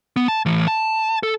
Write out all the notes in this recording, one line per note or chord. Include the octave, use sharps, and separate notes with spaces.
B3
A5
A2 E3
A5
A4